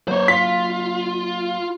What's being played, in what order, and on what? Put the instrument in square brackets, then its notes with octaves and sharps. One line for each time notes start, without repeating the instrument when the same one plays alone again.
[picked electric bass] F#3 A#3 [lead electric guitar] C5 C#5
[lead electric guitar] F4 [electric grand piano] B6